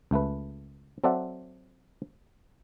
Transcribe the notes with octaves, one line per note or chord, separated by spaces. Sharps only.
C#2 A3 B4
F#3 C4 A4 D5 E5 F#5